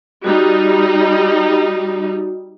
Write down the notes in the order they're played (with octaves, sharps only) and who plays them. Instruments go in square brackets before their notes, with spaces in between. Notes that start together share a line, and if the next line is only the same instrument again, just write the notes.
[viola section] G3 D#4 [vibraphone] F#4